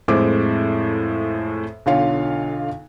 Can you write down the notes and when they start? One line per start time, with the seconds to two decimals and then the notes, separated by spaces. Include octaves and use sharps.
0.08 F2 A2 G#3 C5 D6
1.86 B1 D3 F4 C#5 F5